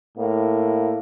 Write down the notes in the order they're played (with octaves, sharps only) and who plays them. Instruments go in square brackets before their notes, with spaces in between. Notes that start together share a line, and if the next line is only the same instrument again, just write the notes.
[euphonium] A2 [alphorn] A#3